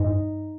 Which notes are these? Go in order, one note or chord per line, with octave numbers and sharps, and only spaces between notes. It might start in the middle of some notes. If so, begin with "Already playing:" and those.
Already playing: G2 D#4